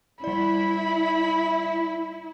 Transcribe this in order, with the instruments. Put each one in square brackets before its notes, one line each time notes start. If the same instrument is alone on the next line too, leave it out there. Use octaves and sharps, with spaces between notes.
[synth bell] G3 D5 [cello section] E4 [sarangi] B5